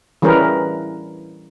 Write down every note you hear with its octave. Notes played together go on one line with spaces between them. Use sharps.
E3 G3 C#4 G#4 A#4 B4